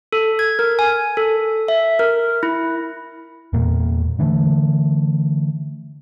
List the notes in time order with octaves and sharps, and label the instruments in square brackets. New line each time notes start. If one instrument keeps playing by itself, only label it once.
[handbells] A4
G#6
A#4
G#5
A4
E5
A#4
E4
[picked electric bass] E2 A#2 A#3
D3 E3 G#3 A3